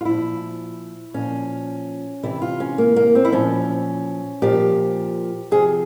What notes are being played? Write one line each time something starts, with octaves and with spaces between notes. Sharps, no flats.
F4
A#2 F3 E4
A#2 F3 C#4
C3 E3 E4
F4
C#4
A#3
A#3
C4
E4
A#2 F3 C#4
A#2 F3 G4
C3 F3 G#4